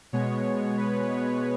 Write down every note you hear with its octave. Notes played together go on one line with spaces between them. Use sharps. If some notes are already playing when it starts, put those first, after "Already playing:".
B2 G#3 B3 C#5
B4
C#5